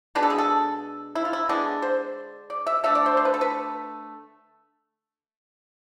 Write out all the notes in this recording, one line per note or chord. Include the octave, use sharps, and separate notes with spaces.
B2 G#3 D4 B4
A4
G#4
A4
E4
F4
E4
D3 G#3 B3 D4
C5
D5
E5
D3 A3 D4 E5
D5
C5
C5
B4
A4
B4